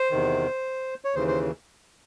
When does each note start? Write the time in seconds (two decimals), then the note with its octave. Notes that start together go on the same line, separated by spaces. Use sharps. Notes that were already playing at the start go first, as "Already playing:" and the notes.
Already playing: C5
0.11 E2 C3 D#3
1.04 C#5
1.15 D#2 C#3 E3 C5
1.28 C5